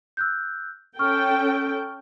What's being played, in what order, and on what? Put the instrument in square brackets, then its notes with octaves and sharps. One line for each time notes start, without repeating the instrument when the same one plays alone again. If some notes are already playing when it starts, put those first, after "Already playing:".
[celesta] E6 F#6 G6
[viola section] C#4 A4 G5 [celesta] C#6 F6